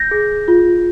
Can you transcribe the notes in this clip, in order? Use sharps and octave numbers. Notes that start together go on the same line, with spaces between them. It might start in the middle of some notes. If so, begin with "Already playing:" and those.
Already playing: G6 A#6
G#4
F4